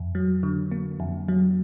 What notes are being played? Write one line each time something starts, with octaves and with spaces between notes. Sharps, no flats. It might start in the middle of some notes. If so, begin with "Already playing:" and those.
Already playing: F2
F#3
D3
A#3
F2
F#3